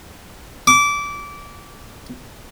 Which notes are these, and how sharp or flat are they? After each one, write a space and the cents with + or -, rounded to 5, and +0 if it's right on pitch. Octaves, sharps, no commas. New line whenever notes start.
D6 -20